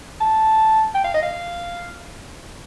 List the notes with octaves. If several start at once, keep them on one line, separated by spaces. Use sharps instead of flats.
A5
G5
F5
D#5
F5